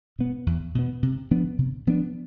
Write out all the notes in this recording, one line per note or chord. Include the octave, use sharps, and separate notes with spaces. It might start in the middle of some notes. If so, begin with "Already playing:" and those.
B2 B3
E2
B2 B3
C3
F3 B3 D4
C3
F3 B3 D4